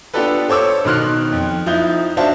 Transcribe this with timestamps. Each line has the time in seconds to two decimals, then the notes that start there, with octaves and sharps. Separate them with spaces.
0.14 B3 D4 F4 G4 A4 B4
0.49 A4 C5 C#5 D6 E6
0.85 B2 D#3 C6 F6 F#6
1.32 F2
1.66 F3 D#4 E4 G6
2.17 D4 F#4 C5 E5 F5 A5